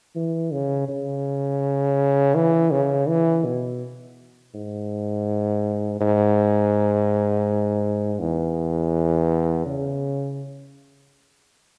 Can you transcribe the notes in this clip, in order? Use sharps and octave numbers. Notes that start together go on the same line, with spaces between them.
E3
C#3
C#3
E3
C#3
E3
B2
G#2
G#2
E2
C#3